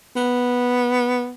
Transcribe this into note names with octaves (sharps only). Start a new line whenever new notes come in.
B3